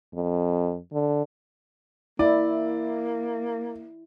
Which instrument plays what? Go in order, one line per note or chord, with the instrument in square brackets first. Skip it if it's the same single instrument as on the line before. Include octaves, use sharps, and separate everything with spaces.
[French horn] F2
D3
[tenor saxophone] A#3 [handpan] E4 [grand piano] D5